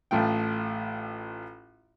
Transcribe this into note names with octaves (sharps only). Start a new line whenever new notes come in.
A1 A2 A3 F4 G5